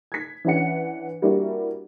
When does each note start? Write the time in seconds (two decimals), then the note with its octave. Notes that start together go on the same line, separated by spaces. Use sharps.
0.12 G#6 B6
0.45 E3 C#4 D4 B4 F#5 C#7
1.22 G3 A#3 D4 E4 F#4 G4